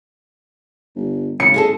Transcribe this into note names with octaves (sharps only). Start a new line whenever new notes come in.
G1
G#1 C#3 C#7
G#3 G#4 A4